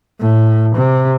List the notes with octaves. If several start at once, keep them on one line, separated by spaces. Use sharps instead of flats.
A2
C3